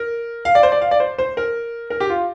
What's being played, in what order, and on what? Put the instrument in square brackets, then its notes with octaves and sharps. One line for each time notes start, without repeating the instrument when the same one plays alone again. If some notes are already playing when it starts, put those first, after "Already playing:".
Already playing: [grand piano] A#4
F5
D5
C5
D5
F5
D5
C5
C5
A#4
A#4
G4
F4